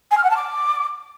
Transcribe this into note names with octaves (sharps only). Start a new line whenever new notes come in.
G#5
F6
F#5
A5
D6